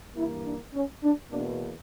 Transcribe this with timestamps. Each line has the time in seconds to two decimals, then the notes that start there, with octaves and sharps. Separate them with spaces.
0.16 G2 E3 A#3 E4
0.45 D4
0.74 C#4
1.03 D4
1.31 E2 B2 A#3 D4